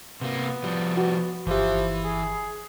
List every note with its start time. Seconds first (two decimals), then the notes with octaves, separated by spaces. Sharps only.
0.21 C3 A#3 B3
0.64 F3 G3
0.97 B3 F#4
1.47 G1 E3 F3 G4 E5
2.04 G#4